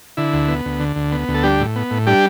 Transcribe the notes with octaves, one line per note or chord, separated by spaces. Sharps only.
D3 E4
D2
B3
D2
D3
D2
B3
D2
A4
G3 D4 G4
A2
B3
A2
G3 D4 G4